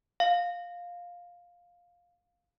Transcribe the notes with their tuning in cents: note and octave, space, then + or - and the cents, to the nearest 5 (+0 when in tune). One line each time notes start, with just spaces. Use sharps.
F5 +10